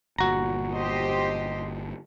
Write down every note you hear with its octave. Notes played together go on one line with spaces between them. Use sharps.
G1 A#2 F#4 A#5
G4 C5 D#5